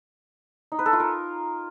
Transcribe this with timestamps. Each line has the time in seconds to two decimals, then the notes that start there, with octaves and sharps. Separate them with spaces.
0.72 D#4
0.79 B4
0.86 A4
0.93 F4
1.00 A#4